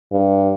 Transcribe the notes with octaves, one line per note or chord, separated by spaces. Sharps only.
G2